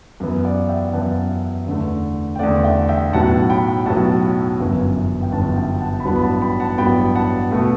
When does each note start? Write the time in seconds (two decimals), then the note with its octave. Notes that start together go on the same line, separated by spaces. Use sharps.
0.20 F#2 E3 B3
0.45 D5 F#5
0.69 E5 G5
0.93 F#2 E3 B3 F#5 A5
1.67 E2 D3 A3
2.35 G5
2.39 E2 D3 A3 D5 F#5
2.64 E5 G5
2.89 E5 G5
3.12 B1 A2 F#3 B3 F#5 A5
3.50 G5 B5
3.85 B1 A2 F#3 B3 F#5 A5
4.60 G1 F#2 E3 B3
5.22 G5
5.32 G1 F#2 E3 B3 F#5 A5
5.56 E5 G5
5.80 F#5 A5
6.00 B5
6.05 A1 G2 F#3 B3 F#5 A5
6.16 B5
6.23 F#5 A5
6.42 G5 B5
6.60 F#5 A5
6.78 A1 G2 F#3 B3 G5 B5
7.15 F#5 A5
7.51 B2 A3